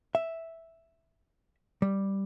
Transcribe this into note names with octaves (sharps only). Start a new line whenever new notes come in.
E5
G3